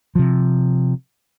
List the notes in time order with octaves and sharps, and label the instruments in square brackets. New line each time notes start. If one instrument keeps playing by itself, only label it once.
[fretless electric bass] C3 F3